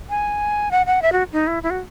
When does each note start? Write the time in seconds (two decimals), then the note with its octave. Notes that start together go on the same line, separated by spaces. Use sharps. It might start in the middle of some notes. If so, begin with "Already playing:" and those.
0.10 G#5
0.71 F#5
0.86 F#5
1.02 E5
1.12 F#4
1.33 D#4
1.47 E4
1.63 E4
1.70 F#4